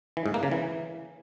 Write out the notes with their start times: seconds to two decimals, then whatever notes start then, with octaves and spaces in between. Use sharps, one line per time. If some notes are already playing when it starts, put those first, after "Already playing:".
0.17 E3
0.26 G#2
0.34 A#3
0.43 C#3
0.51 E3